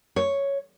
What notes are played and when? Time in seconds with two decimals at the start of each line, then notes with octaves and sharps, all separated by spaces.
0.16 C#5